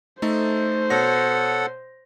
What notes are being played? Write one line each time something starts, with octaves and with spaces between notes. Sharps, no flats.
A3 D#4 A4 C5
B2 A4 C#5 F#5 A#6